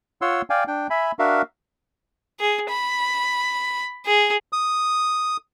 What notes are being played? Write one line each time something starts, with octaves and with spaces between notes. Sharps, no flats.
F4 C#5 F#5 C6 E6
D5 F5 G5 G#5
D4 G5
E5 G#5 B5
D4 F#4 A#4 E5 F5
G#4
B5
G#4
D#6